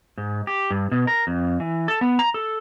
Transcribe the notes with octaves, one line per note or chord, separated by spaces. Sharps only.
G#2
G4
G2
B2
A#4
F2
E3
A4
B3
A#5
A4